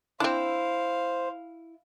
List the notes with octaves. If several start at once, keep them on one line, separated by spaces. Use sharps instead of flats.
C4 D4 E4 C5 F5